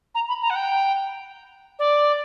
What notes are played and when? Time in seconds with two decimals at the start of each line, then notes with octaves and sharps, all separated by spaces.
0.15 A#5
0.28 B5
0.42 A#5
0.50 F#5
0.55 G5
1.79 D5